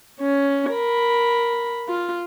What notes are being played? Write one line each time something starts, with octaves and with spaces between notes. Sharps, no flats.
C#4
A#4 B5
F4